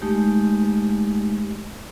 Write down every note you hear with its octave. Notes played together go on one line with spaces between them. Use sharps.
G#3 A3 D#4 G4